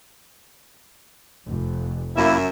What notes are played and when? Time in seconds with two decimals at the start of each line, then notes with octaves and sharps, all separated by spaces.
1.45 F1 F2
2.16 F#2 A#3 E4 E5